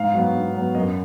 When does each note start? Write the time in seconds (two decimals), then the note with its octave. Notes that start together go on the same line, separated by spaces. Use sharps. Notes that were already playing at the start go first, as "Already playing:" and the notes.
Already playing: G#2 F5
0.14 F#3 B3
0.34 G#2
0.55 F#3 B3
0.75 F#2 D#5